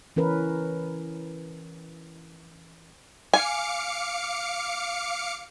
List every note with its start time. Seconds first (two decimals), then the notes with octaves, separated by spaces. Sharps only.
0.16 E3 C#4 A#4 B4
3.34 F5 G#5 D6 C#7